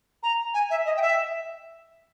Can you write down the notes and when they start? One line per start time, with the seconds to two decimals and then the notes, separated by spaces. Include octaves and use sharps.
0.23 A#5
0.54 G#5
0.70 E5
0.86 D#5
0.97 G5
1.02 E5